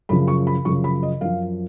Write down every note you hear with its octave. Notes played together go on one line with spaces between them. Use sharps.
F#2 C#3 F3 B5
C#6
B5
F#2 C#3 F3 C#6
B5
D#5
F#2 F3 F5